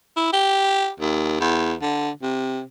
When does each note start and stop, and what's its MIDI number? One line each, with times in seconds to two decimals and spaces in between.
0.17 0.31 64
0.33 0.90 67
1.00 1.39 39
1.40 1.74 40
1.82 2.10 50
2.23 2.61 48